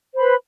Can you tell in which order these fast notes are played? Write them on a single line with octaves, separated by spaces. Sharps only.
C5 B5 B4